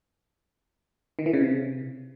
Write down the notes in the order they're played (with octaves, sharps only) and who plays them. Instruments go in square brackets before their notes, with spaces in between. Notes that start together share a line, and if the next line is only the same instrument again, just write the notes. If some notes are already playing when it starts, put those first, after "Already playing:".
[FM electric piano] D#3
E3
C#3
C3